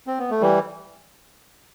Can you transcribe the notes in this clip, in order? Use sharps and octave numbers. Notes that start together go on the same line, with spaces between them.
C4
B3
A3
E3 G3